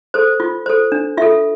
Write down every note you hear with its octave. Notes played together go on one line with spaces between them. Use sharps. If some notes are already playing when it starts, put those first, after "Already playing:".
A4 C5
F4
A4 C5
D4
F4 A4 E5